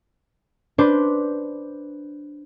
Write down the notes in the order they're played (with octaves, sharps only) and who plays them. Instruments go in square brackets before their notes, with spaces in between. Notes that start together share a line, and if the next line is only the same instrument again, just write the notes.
[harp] D4 B4 C5